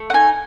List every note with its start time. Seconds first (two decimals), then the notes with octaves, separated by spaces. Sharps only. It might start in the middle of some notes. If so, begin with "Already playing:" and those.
Already playing: A3
0.10 F#5
0.13 D#4 G#5